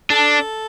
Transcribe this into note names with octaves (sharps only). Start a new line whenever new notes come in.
D4 A4